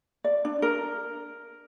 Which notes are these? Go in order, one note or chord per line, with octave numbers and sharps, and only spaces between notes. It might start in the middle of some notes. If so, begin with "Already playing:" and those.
D5
D4
A#4